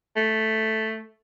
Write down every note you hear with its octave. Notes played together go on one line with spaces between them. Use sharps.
A3